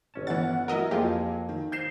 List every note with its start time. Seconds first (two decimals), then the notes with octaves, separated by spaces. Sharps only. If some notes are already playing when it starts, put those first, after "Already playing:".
0.14 G1 C#4 A5
0.27 E3 B3 E4 F#5 A6
0.68 F#3 E4 F#4 A#4 D#5 E5
0.91 F2 F#3 A#3 F4 G4 G#4
1.49 D#3
1.72 D#4 C5 F5 G6 C7 E7